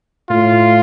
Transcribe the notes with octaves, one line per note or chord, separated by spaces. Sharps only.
A2 F4